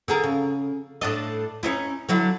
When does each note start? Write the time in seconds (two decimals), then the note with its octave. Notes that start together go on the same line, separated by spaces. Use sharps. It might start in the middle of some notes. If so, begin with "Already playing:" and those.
0.08 D3 G#4 A#4
0.24 C#3
1.01 A2 D4 D#5
1.63 C#4 D#4 E4
2.09 D3 F#3 E4